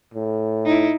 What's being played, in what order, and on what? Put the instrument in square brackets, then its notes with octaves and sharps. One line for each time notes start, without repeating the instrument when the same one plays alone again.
[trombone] A2
[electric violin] D#4 E4